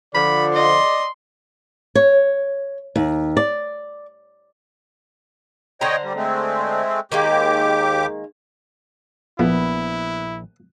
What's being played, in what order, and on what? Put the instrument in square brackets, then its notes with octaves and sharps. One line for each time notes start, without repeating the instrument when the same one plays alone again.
[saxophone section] D3 F3 [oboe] D5 [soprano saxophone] B5
[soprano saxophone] D#5 [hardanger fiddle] C6
[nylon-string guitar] C#5
D#2
D5
[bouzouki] D3 C5 A#5 [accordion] C#5 D#5 G5
[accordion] G3
G#3 A3 C4
[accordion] D#2 G4 D6 [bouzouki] D#3 G#3 A#3
[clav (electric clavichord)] A#1 [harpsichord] F3 [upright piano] B3 [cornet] E4